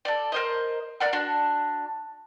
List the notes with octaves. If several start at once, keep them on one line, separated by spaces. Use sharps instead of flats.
A4 D5
A#4 C5 D#5
A#4 D5 F#5
D4 F#4